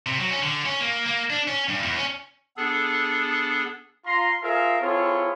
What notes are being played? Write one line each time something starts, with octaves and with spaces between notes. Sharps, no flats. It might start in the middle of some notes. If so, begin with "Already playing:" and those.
C3
F#3
C#4
D3
C#4
A#3
A#3
D4
C#4
G2
E2
C#4
B3 D4 G#4 A4
F4 A#5 C6
F4 G#4 A#4 C5 E5 F5
C4 E4 F4 G#4 A4 C#5